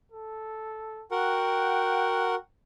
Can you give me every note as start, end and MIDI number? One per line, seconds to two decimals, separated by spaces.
0.12 1.03 69
1.11 2.35 66
1.11 2.35 70
1.11 2.35 78
1.11 2.42 79